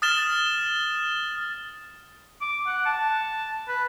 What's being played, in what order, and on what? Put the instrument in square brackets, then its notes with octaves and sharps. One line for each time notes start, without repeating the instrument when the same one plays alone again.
[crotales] D#6 F6 A6 E7 G7
[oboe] D6
F#5
A5
B4